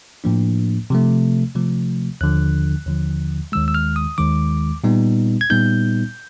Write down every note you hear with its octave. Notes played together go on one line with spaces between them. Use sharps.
A2 F3 A#3 D4
C3 F3 A3
C3 F3 A3
D#2 D3 F3 F#6
D#2 D3 F3
D#2 D#3 G#3 E6
E6
F6
D#6
D#2 D#3 G#3 D6
A#2 G3 B3 D#4
G#6
A#2 G3 B3 D#4 G6